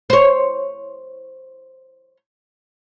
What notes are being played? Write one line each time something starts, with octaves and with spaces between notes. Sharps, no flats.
C5 C#5